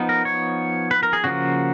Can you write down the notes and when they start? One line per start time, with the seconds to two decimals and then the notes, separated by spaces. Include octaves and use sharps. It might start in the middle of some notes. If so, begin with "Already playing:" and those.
Already playing: F3 B3 D#4
0.09 A#4
0.25 C#5
0.91 B4
1.03 A#4
1.13 G#4
1.24 C#3 F3 A#3 F#4